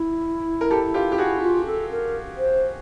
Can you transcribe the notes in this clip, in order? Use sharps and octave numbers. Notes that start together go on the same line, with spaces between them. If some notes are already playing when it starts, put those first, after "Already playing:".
Already playing: E4
A#4
G4 A4
F4 G4
G4
F#4 G#4
F4
A4
A#4
C5